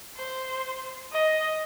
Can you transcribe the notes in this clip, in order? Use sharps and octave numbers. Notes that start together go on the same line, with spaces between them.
C5
D#5